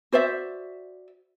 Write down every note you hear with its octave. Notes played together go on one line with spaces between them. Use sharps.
F#4 C5 D5 E5